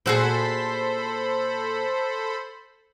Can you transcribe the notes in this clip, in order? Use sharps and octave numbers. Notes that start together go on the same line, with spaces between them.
A#2 F#4 G#4 A4 C5 B5